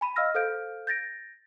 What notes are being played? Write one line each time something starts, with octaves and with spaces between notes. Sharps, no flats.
G#5 B5 D#7
D#5 F5 E6 F6 A#6
A4 C5 F5 F6 G6 D7
G6 A6 A#6 D7